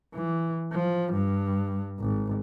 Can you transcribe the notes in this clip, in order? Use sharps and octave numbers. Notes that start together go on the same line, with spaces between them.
E3
F3
G2
G#1